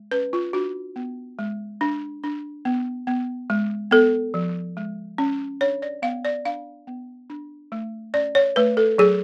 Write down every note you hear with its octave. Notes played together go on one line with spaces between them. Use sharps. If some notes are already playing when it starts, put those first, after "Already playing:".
Already playing: G#3
C#4 B4
F4
D4 F#4
B3
G#3
D4
D4
B3
B3
G#3
B3 A4
F3
G#3
C#4
D4 C#5
D5
B3 F5
D5
D4 F5
B3
D4
A3
C#4 D5
C#5
A3 B4
A4
F#3 G#4